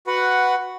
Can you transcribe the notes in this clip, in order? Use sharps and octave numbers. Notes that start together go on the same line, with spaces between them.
F#4 B4 F#5